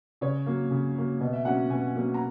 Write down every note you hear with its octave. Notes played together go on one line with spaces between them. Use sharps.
C#3 C#5
F#3 A#3
C#3
F#3 A#3
B2 D#5
E5
F#3 A#3 C#4 F#5
B2 G#5
F#3 A#3 C#4
A#5